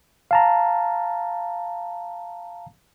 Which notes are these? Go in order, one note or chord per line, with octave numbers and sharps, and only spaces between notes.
F5 A5 A#5